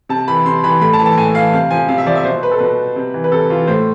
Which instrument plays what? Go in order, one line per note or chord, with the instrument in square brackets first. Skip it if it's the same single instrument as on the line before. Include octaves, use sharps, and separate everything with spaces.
[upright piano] C3 A5
E3 B5
C3 C6
E3 B5
A2 B5
A5
E3
A5
A2 G#5
E3 F5
C3 F5
F3 G#5
C3 F5
E5
F3 D5
E5
B2 C5
B4
A4
B2 B4
C3
E3
B4
C3 A4
E3 F4
A2 C5